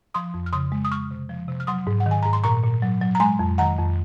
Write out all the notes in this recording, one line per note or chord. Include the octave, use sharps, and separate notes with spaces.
F3 C6 D#6
F2
F6
C#3 C6 D#6
G#3
D#6
G#3 C#6 F6
C3
F3
C3
F6
F#3 C6 D#6
G#2
F#5
D#3
G#5
G#2 A#5
C6
A#2 A#5 C#6
A#2
F#3
F#3
A#5
G#3 G#5 C6
F2
D#3 F#5 A#5
F2